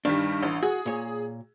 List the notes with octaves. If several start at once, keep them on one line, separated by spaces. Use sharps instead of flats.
G2 D#3 G3 D4
A1
F#4 G#4
A#2 C#5